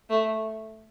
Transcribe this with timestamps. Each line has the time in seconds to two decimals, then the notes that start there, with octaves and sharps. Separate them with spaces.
0.10 A3